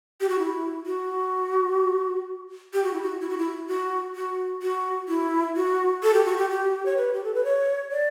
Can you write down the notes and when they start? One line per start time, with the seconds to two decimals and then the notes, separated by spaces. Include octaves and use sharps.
0.20 G4
0.29 F#4
0.39 E4
0.86 F#4
2.73 G4
2.84 F#4
2.93 E4
3.02 F#4
3.21 E4
3.29 F#4
3.38 E4
3.68 F#4
4.15 F#4
4.62 F#4
5.08 E4
5.56 F#4
6.03 A4
6.14 G4
6.25 F#4
6.37 G4
6.50 G4
6.86 C#5
6.97 B4
7.13 G4
7.24 A4
7.34 B4
7.44 C#5
7.91 D5